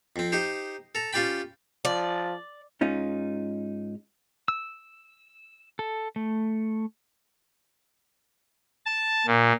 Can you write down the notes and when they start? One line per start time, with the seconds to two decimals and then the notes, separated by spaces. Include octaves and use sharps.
0.16 F2 C4
0.32 D#4 G4 C5
0.95 A4 A#5
1.13 C#4 F4 G4 D5 G5 B5
1.85 F3 D5
2.81 G#2 C#4 D#4 F4
4.48 E6
5.79 A4
6.16 A3
8.86 A5
9.27 A#2